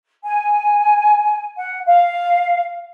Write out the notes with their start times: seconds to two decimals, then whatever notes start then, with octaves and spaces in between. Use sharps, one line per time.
0.22 G#5
1.57 F#5
1.86 F5